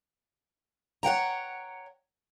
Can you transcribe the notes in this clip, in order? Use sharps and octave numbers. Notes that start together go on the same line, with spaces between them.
C#5 F#5 G5 A#5